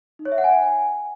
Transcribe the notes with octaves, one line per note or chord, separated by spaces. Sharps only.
D#4
C#5
E5
F#5
G#5